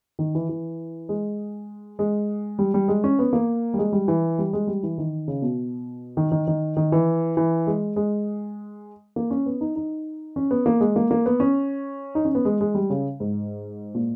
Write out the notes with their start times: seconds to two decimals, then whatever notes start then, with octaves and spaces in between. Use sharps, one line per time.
0.19 D#3
0.35 E3
0.49 E3
1.09 G#3
1.99 G#3
2.59 G3
2.74 G3
2.88 G#3
3.04 C#4
3.19 B3
3.33 A#3
3.74 G3
3.79 G#3
3.92 G3
4.08 E3
4.38 G3
4.53 G#3
4.67 G3
4.83 E3
4.98 D#3
5.28 C#3
5.42 B2
6.17 D#3
6.32 D#3
6.47 D#3
6.77 D#3
6.92 E3
7.37 E3
7.67 G#3
7.96 G#3
9.16 A#3
9.31 C#4
9.46 B3
9.61 D#4
9.76 D#4
10.36 C#4
10.51 B3
10.66 A#3
10.81 G#3
10.96 A#3
11.11 A#3
11.26 B3
11.40 C#4
12.15 D#4
12.25 C#4
12.35 B3
12.45 G#3
12.61 G#3
12.75 G3
12.90 C#3
13.20 G#2
13.95 A#2